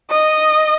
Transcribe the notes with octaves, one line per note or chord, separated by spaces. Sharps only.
D#5